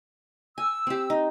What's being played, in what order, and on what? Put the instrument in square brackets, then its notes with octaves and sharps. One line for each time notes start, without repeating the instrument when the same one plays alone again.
[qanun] G#5 [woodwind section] E6
[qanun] C4 G4
D#4